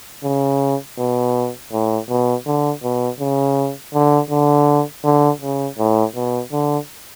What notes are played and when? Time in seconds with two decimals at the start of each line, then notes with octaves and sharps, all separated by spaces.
0.24 C#3
0.98 B2
1.72 A2
2.09 B2
2.46 D3
2.83 B2
3.20 C#3
3.94 D3
4.30 D3
5.04 D3
5.42 C#3
5.78 A2
6.15 B2
6.52 D3